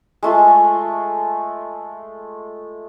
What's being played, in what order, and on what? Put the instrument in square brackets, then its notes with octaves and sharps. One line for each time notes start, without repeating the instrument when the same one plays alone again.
[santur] G#3 A3 F4